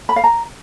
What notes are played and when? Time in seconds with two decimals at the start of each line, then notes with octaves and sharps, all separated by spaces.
0.09 B5
0.16 F5
0.24 A#5